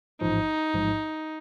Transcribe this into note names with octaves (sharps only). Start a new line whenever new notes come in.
A1 G#2 F3 D#4
A1 G#2 F3